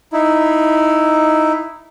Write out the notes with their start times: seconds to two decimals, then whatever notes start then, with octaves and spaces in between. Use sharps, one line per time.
0.13 D#4 E4